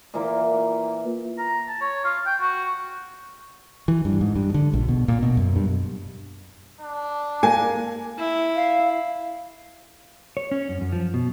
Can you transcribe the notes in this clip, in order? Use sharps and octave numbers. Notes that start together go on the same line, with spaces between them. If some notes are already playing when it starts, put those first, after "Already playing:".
A#2 E3 A#3
A#5
A5
C#5
F4
G5
F#4
E3
G2
G#2
G2
D3
A#1
B2
A#2
B2
F#2
G2
D4
A#3 G#5
E4
F5
C#5
C#4
F#2
F#2
F3
B2